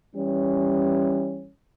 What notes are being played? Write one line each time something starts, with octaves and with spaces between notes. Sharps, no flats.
E3 G3 C#4